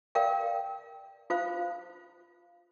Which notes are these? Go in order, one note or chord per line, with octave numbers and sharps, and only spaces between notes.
A#4 D5 F5 G5
F4 C5 F5